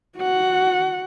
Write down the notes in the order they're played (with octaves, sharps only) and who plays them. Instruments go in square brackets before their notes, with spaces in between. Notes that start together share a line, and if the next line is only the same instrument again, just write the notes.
[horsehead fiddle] F#4 F#5